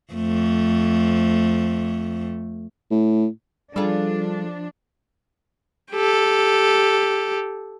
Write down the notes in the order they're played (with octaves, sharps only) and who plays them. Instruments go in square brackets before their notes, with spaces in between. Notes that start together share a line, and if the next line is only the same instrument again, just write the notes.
[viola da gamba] F2 A3
[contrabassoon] A2
[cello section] F3 D4 [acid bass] G3 [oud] F4 G#4 A4
[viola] G4 A4